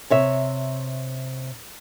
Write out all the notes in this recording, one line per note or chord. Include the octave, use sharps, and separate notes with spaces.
C3 C#5 E5